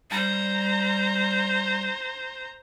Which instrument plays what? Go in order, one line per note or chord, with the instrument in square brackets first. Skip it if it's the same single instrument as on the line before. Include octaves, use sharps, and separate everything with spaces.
[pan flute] G3 [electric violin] C5 A#5